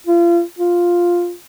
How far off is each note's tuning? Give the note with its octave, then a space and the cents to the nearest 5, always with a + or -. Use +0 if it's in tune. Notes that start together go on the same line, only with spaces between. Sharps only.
F4 -35
F4 +0